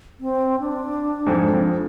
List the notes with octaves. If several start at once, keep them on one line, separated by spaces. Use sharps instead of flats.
C4
D4
F2 G#2
F2